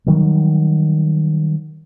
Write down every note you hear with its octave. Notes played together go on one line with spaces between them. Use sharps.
D#3 F#3 G3